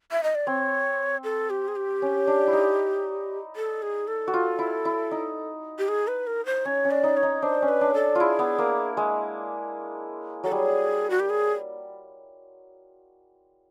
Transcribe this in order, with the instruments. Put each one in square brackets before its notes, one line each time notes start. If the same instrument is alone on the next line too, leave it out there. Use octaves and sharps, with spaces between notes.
[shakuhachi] E5
D#5
D5
[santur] C4 [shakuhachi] C#5
[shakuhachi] A4
G4
G#4
G4
[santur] C#4
D4
E4
D#4
[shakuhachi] A4
G#4
A4
[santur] F#4
F4
E4
E4
D#4
[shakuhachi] G4
G#4
B4
A#4
C5
[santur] C#4 [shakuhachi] C#5
[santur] C#4
[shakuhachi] D5
[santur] D#4
[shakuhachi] C#5
[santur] D#4
[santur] D4 [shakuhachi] C5
[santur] C#4
[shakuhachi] B4
[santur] D4
[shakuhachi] A4
[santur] E4 F4 [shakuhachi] G#4
[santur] B3
A#3
G#3
[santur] F#3 [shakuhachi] A4
[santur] G3 [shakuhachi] G#4
[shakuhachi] F#4
G4
G#4